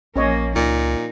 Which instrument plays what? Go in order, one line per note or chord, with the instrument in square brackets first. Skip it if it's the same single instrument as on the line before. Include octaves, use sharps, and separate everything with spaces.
[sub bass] A#1 [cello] F3 A#3 [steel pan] C#4 C#5 D#5
[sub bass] C#2 [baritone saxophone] A#2 [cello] D#4